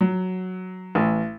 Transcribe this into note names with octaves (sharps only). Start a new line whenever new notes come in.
F#3
A1